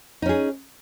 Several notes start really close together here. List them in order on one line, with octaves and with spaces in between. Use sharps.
D#4 C#4 G#4